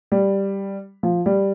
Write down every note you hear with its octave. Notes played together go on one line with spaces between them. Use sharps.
G3
F3
G3